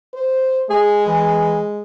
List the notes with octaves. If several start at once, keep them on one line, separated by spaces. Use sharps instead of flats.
C5
G#3 G#4
E3